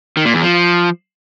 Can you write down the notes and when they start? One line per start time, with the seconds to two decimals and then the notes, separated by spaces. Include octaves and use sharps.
0.17 D#3
0.25 A#2
0.34 E2
0.43 F3